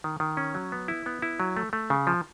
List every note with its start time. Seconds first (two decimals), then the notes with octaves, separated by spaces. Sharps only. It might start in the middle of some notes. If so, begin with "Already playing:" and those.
0.04 D#3
0.20 D#3
0.37 C#4
0.55 F#3
0.72 B3
0.88 E4
1.06 B3
1.22 E4
1.40 F#3
1.57 A3
1.73 A3
1.90 C#3
2.07 F3